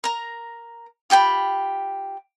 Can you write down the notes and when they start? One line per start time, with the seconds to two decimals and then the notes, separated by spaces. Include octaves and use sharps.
0.04 A#4 A#5
1.10 F4 G4 G5 B5